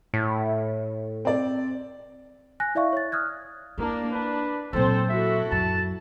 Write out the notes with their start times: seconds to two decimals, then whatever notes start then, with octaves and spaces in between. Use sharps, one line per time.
0.14 A2
1.25 C4 D5
2.60 G#5 F#6 A#6
2.75 E4 D5 E5 F5 C#6
2.93 C#5 A6
3.12 D#6 F6 F#6 G#6
3.78 A#3 D4 E4
4.12 D4 B4
4.73 A#2 F#3 C4 A4 C5
5.10 E4 F#4 A4 E5
5.51 F#2 A5